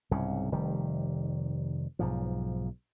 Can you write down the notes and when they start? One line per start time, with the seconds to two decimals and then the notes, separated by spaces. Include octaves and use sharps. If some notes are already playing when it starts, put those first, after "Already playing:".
0.11 C2 G#2 C#3
0.52 F1 D#3 G3
1.99 B1 G#2 F3